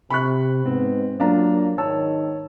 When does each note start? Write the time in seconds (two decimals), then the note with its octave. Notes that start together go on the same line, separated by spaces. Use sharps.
0.10 C3 B5 C#6 F#6
0.66 G#2 B3 C4
1.20 F#3 A#3 D4 F4 A#5
1.78 G#2 D#3 C#5 A5 E6